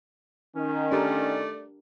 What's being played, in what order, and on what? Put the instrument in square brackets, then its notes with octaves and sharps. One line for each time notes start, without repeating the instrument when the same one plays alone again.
[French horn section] D#3 [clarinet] C#4
[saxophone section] A3 D5 [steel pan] D4 G4 A#4